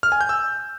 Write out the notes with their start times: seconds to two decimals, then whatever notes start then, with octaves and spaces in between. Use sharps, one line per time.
0.03 F6
0.12 G#5
0.21 G6
0.29 E6